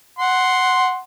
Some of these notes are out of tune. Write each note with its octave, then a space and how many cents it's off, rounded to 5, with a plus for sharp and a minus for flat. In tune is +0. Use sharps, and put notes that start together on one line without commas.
F#5 +0 C6 +0